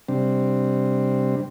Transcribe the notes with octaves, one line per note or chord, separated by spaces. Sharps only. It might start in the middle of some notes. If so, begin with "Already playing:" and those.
C3 G3 C4 D4